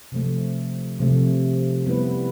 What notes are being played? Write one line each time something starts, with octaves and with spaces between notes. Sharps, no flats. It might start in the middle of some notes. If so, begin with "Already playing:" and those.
C3 F3 A3
C3 F3 A3
G3 B3 E4 B4